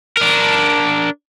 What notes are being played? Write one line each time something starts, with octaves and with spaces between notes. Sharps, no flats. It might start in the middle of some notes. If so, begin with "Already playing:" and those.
D4 A#4